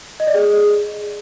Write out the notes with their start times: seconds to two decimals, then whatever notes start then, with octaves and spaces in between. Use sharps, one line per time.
0.20 D#5
0.27 D5
0.34 G#4